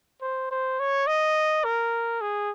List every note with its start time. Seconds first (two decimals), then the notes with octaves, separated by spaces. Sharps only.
0.22 C5
0.51 C5
0.80 C#5
1.07 D#5
1.64 A#4
2.21 G#4